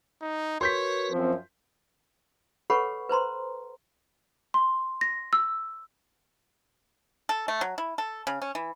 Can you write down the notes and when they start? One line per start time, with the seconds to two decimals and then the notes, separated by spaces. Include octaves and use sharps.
0.22 D#4
0.61 F#4 A#4 B4 C#5 C6 G6 B6
1.12 F#2 F3 C4
2.70 A4 B4 C#5 F#5 B5 C#6
3.09 B4 C5 A#5 C6
4.54 C6
5.01 A#6
5.33 E6
7.29 A4
7.48 A3
7.61 F#3
7.78 E4
7.98 A4
8.27 C#3
8.42 C#4
8.55 E3